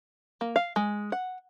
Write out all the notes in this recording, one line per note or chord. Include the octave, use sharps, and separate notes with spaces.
A#3
F5
G#3
F#5